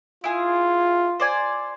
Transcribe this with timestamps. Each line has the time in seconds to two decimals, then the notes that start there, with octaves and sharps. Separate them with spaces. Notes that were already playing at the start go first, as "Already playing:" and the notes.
0.24 E4 F4 G#4
1.20 C5 D5 G#5